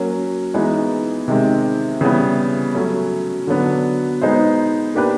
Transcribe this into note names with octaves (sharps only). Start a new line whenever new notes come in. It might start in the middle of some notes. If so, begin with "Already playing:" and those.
Already playing: F#3 A#3 C#4
E3 G#3 B3 D#4
C3 D#3 G#3 C4
C#3 E3 G3 B3
F#3 A3 C#4
D3 F#3 B3 D4
G#3 B3 D#4 G#4 C5
A#3 D4 G4 B4